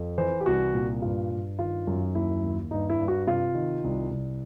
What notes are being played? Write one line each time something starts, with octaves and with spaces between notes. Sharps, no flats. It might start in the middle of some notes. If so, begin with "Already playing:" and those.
Already playing: F2
E3 C5
G4
C2 F#4
A#2
G2 F4
G2
D#3 F4
F#2
D#2 E4
D#2
G2 D#4
E4
G2
F#4
C3 F4
D#3
C2
C2